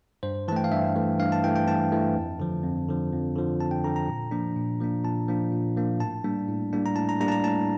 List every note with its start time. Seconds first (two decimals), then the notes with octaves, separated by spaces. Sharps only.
0.23 G2 C5
0.48 E3 A5
0.52 A3 G5
0.64 F5
0.72 G2 E5
0.96 E3 A3
1.19 G2 F5
1.32 A5
1.44 E3 A3 G5
1.56 G5
1.67 G2 A5
1.92 E3 A3
2.16 F2
2.40 D3 F3
2.63 F2
2.88 D3 F3
3.12 F2
3.36 D3 F3
3.59 F2 A5
3.71 G5
3.84 D3 F3 A#5
3.96 A#5
4.08 A#2
4.31 F3 A#3 D4
4.56 A#2
4.80 F3 A#3 D4
5.04 A#2 A5
5.28 F3 A#3 D4
5.52 A#2
5.77 F3 A#3 D4
6.00 A2 A5
6.24 G3 A#3 D4
6.48 A2
6.73 G3 A#3 D4
6.86 A#5
6.96 A2 A5
7.09 A#5
7.20 G3 A#3 D4 A#5
7.28 A5
7.32 A#5
7.44 A2 A5